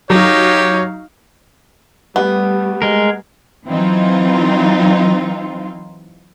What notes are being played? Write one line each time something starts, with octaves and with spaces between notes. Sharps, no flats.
F#3 D#4 G4 C#5 F5
G3 A3 B3
G#3 A#4
E3 F#3 C4 D#4 F4